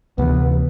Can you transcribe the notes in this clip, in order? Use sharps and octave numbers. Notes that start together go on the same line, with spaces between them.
D2 C3 E3 B3